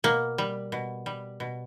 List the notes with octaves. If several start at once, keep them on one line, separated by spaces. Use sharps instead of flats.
B2 A#3
G3
B2
G3
B2